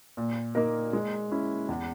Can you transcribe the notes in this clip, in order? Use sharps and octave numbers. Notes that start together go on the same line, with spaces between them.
A#2
A#3 D#4 A#4
G#3
C#4 E4
E2